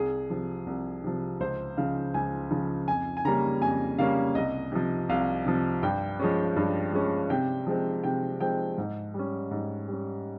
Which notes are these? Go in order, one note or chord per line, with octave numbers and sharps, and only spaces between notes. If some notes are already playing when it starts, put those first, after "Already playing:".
Already playing: C2 G#4
C3 F3
C2
C3 F3
C#2 C5
C#3 F3 F5
C#2 G#5
C#3 F3
F2 G#5
G#5
C#3 G3 A#3 C#4 A#5
F2 G#5
C#3 G3 A#3 C#4 F5
C2 D#5
C3 F3
C2 F5
C3 F3
G2 G5
F3 G#3 C#4
G2
F3 G#3 C#4
C3 G5
F3 G#3 C4
C3 G5
F3 G#3 C4 G5
G#2
G3 C#4
G#2
G3 C#4